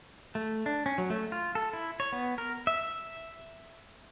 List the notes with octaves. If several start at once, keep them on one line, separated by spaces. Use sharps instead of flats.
A3
D4
C#4
F#3
A3
F4
A4
E4
C#5
B3
A#4
E5